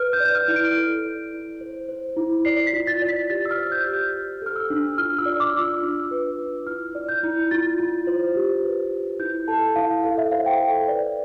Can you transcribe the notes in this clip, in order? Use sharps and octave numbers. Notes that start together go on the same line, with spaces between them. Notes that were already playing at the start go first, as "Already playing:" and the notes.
Already playing: B4 F6
G6
D5
G6
F6
E4
D7
A4
D5
E4
C5
C5
E4
D5 C7
B6
F4
A6
D5
B6
G4 A6
E6
F6
C5
G6
G4
G6
C5
A4 F6
E6
D4
F4 F6
E6
D5
E6
D6
F4
E6
D4
B4
F4
E4 F6
D5
G6
E4
F4 A6
F4
C5
G4
B4
B4
E4 G6
A4 A5
E4 F5
A4 F5
E5
C5 F5
G5
A4
B4 D5